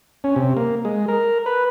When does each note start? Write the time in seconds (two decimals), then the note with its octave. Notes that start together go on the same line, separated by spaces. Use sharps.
0.24 C#4
0.36 C3
0.57 A#3
0.85 G#3
1.08 A#4
1.46 B4